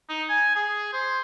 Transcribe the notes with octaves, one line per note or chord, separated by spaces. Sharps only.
D#4
G#5
G#4
C5